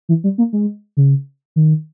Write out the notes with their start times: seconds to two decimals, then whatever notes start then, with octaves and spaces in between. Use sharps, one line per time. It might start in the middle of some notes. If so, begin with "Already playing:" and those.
0.09 E3
0.24 G3
0.38 A#3
0.53 G#3
0.97 C#3
1.56 D#3